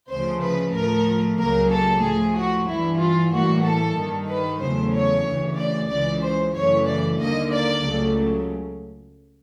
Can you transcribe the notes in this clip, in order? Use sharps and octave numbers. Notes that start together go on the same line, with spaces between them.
D2 C#3 F3 A3 C5
B4
A2 F3 A3 A#4
C#2 C#3 F#3 A#3 A#4
A4
A2 F3 A3 G#4
F#4
G2 E3 G3 E4
F4
A2 E3 G3 A#3 F#4
A4
G2 D#3 G3
B4
E2 C#3 F#3 A3 C5
C#5
D2 C#3 E3
D5
C#2 C#3 E3 D5
C5
F#2 C#3 E3 A3 C#5
D5
D#2 D3 G3 A#3 D#5
D5
C#2 C#3 F#3 A3